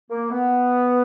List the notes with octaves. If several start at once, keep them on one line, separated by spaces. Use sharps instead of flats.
A#3
B3